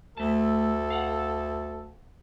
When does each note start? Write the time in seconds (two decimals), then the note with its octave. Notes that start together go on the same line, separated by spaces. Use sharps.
0.17 D2 A3 A4 A5
0.90 F5 F#5